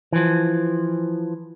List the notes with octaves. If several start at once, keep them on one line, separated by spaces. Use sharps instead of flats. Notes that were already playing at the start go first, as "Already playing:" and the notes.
E3 F3